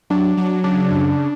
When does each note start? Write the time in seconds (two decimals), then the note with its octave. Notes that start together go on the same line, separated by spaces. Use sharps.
0.10 F#3 D4
0.37 F#3
0.64 C#3 D4
0.91 F#2